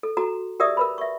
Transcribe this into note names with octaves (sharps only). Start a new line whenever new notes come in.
A4
F#4 A4 A#5
G4 A#4 D5 E5 D#6
A#4 B4 B5
E5 C#6